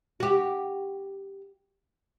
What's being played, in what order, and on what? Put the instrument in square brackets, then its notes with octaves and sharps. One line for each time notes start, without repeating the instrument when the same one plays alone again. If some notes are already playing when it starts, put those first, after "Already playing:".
[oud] F#4 G4